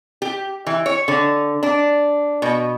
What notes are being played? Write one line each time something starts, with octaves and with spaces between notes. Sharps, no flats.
G4
E3
C#5
D3
D4
B2